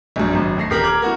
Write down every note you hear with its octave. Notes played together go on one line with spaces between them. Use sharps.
A#1 F#2
G#1 F#2
E2 A3 A#6 C7
D#1 G4 A#4 A#6 F#7
A#5 D6 F6 G#6 F#7
E3 F#4 A#4